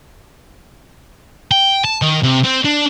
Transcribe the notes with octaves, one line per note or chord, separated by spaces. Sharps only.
G5
A5
D#3
C3
C4
D4